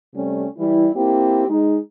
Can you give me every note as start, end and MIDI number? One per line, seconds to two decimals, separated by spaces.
0.14 0.46 48
0.14 0.46 55
0.14 0.46 57
0.14 0.46 61
0.57 0.88 52
0.57 0.88 55
0.57 0.88 64
0.94 1.47 58
0.94 1.47 60
0.94 1.47 64
0.94 1.47 67
1.48 1.77 56
1.48 1.77 63